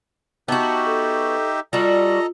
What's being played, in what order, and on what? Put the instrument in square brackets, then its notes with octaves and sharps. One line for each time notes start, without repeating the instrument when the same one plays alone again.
[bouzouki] B3 F#4 [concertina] D#4 G4 E5 [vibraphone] A5
[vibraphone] A4
[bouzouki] G3 F#4 [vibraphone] F4 [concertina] A4 D#5 A#5